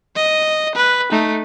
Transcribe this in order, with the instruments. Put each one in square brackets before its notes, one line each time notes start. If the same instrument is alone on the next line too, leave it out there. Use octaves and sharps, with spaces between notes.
[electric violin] D#5
B4
A3 D#4